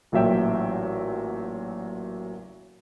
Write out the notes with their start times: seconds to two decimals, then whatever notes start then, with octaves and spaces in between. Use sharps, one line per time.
0.12 A1 A#2 F#3 E5 G5